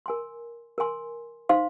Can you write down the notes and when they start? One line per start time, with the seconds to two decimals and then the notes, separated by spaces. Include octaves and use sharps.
0.06 A#4 G#5 C6
0.78 A#4 G#5 C6
1.49 D#4 C5 F5 C6